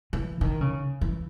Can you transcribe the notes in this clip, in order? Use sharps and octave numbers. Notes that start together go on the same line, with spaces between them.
E3
D#3
C#3
E3